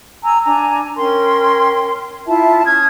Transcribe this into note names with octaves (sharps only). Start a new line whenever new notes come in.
G#5 A#5 E6
D4 G#5 A#5
C#4 A#4 G5 C6
E4 F4 E5 A5
C#4 D#6 F6 G#6